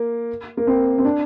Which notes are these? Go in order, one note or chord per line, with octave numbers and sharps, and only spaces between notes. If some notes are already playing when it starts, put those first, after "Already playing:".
Already playing: A#3
A#3
C4
C4
D4